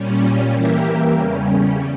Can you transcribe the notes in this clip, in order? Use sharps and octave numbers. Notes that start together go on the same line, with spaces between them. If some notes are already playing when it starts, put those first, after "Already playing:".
Already playing: A#2 G3 C#4
E3 A#3 E4 G4 A#4
E2 C#3 G3 C#4